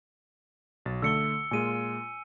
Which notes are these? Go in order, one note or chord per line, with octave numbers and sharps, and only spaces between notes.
B1 A6
D3 A3 E6 C#7 G7
A#2 G#3 F4 G#5 D#7